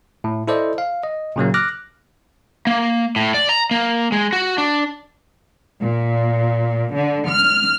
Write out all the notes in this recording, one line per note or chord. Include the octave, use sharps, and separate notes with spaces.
A2
E4 A4 C5 D5 D#5
F5
D#5
A#2 C#3 F#3 A#3
D6 F6 F#6 A#6
A#3
A2
D5
A#5
A#3
G#3
F#4
D4
A#2
D3
F6